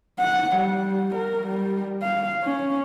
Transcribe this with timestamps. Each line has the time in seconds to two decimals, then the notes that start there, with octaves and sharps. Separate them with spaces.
0.20 F#5
0.57 G3
1.15 A#4
1.47 G3
2.02 F5
2.43 C#4